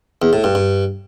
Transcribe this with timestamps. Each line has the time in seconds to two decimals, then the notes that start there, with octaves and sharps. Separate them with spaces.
0.22 E2
0.33 A2
0.44 G2
0.55 G2